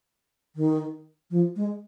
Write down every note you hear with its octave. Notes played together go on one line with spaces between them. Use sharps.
D#3
F3
G#3